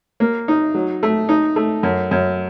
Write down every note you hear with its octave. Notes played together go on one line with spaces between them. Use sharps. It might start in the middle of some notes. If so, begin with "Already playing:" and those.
A#3
D#4
F#3
A3
D#4
A3
F#2
F#2